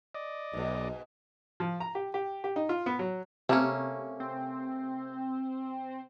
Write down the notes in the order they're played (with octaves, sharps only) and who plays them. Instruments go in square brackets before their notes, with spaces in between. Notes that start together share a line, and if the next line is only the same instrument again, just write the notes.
[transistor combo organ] D5 D#5
[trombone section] B1 [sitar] G#2 B2
[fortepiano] F3
A#5
G4
G4
G4
D#4
F4
B3
F#3
[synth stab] C3 [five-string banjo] A3 A#3 C#4
[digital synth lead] C4